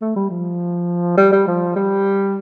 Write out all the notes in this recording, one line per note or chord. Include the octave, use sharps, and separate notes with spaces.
A3
G3
F3
G3
G3
F3
G3